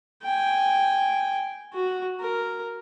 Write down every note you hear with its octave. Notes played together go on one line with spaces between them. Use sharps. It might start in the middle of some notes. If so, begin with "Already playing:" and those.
G5 G#5
F#4
A#4